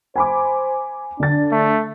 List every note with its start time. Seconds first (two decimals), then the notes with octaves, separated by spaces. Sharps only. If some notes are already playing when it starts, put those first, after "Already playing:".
0.16 C5 G#5 B5 D6
1.20 D3 D4 A6
1.52 A3